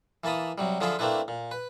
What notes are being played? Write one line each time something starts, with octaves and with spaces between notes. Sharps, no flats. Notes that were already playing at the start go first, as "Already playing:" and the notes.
E3 A#3 A5 B5 D#6
C3 F#3 G3
D3 F3 F4 G#4 E5 B5
A3 A#3 C4 D4 E4 B4
A#2
B4